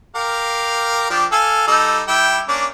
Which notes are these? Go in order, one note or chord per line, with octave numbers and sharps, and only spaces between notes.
G4 A#4 F5
F3 D4 G4
A4 F5 G#5
G3 D#4 A4
G3 E4 G5
A#3 C#4 D4